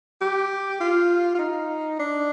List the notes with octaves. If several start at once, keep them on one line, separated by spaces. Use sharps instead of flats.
G4
F4
F4
D#4
D4